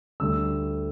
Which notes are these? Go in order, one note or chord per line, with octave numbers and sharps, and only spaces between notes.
D2 D3 G3 E6